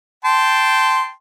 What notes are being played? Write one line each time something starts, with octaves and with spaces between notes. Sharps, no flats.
G5 A5 C6